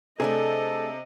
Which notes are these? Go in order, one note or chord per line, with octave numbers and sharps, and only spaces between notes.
C3 A3 D4 G#4 A4 D#5